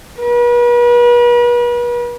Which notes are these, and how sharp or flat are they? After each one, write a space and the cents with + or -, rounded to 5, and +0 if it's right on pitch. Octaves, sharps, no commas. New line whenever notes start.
B4 -40